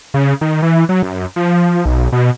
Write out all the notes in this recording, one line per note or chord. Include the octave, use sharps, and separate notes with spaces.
C#3
D#3
E3
F#3
F#2
F3
B1
B2